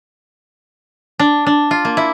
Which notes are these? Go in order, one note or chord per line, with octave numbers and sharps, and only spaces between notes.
D4
D4
F4
A#3
E4